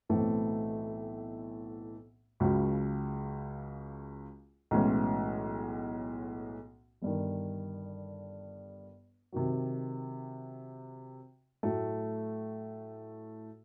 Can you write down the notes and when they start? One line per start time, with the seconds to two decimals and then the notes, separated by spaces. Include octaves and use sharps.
0.09 B1 A2 E3 A3 C4
2.40 C#2 C#3 F#3
4.71 B1 A2 E3 G#3 C#4
7.02 G1 G2 D#3
9.32 C3 D#3 F#3
11.63 A2 F#3 A3